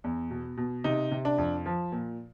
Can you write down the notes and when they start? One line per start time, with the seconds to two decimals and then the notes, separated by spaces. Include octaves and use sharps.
0.04 E2
0.30 B2
0.57 B2
0.84 C3 D#4
1.11 C3
1.25 D4
1.38 F2
1.66 F3
1.92 A#2